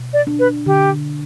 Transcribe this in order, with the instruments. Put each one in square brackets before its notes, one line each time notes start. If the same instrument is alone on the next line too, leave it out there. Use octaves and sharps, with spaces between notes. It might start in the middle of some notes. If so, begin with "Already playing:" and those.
Already playing: [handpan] B2
[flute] D5
[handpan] D4
[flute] B4
[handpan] D3 [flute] G4